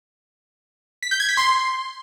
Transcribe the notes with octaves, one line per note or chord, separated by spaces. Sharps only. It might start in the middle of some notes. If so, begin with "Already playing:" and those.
B6
G6
G#6
B6
C6